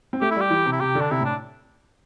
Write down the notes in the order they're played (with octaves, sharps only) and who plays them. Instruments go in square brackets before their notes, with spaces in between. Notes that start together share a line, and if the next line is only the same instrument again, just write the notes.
[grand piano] C4
[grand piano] A3 [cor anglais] G4
[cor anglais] E4
[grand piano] G3 [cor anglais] G4
[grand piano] E3
C3
[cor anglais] E4
[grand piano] C3 [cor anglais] G4
[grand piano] D3
[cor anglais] D4
[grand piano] C3 [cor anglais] E4
[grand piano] A2 [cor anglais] D4